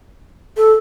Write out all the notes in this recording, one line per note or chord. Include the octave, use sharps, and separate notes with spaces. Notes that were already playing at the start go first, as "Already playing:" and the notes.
A4